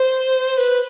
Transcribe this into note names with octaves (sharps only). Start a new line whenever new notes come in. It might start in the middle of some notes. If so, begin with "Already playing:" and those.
Already playing: C5
B4